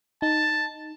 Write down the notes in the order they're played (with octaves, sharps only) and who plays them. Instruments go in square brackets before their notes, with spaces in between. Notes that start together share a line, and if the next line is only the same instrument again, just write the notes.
[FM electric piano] D#4 [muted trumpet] A5